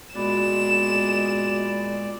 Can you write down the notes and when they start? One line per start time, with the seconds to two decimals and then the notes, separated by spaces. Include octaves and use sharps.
0.15 A#2 G#3 B3 F#4 D5 B5 E7